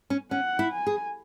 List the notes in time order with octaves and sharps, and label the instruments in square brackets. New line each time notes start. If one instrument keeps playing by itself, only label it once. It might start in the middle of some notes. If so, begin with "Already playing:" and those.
[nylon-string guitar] C#4
[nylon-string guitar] C#4 [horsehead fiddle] F#5
[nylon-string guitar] E4
[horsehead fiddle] G#5
[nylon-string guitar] G#4